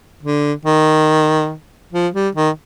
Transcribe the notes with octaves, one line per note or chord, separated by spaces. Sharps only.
D3
D#3
F3
G3
D#3